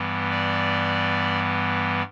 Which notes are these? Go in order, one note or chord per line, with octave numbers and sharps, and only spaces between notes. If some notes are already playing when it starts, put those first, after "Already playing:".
Already playing: G2 E3 G3 B3
D5